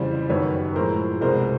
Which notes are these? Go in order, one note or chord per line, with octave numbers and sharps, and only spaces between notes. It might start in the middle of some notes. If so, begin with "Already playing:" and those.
Already playing: F2 C#3 E3 G3 C5 D5
F#2 D#3 G3 B4 C#5
A2 F3 G#3 A#4 C5
C2 B2 G#3 A#4 C5